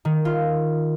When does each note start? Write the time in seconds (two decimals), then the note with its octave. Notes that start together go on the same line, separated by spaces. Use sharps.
0.05 D#3
0.25 F4